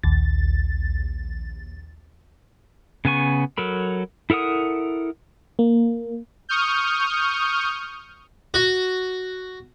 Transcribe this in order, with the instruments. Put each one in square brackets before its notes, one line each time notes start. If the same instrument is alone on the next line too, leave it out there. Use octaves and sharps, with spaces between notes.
[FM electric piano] A#1 D#2 A6
[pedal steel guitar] C#3 B3 G#5 C#6
F#3 A4 A#4 B5
E4 A4 A#4 F#5 D#6
[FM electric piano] A#3
[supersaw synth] C#6 D#6 F6 G6
[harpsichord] F#4